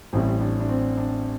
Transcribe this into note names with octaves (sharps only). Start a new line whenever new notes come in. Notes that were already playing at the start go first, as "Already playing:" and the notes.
A1 A2 G3 C4
D4
D4
C4
D4